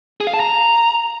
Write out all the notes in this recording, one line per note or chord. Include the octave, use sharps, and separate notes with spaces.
G#4
F5
A5
A#5